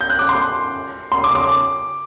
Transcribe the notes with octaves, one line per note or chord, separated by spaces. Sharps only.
G6
F#6
D6
C6
C6
D6
D6